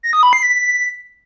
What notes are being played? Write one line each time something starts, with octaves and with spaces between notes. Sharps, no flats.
A#6
D#6
B5
C7
B6